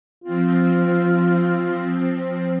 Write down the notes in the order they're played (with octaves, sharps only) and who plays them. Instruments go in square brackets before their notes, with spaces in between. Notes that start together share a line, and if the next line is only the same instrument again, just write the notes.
[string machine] F3 C4 [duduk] F4